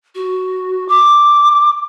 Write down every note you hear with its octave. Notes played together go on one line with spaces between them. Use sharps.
F#4
D6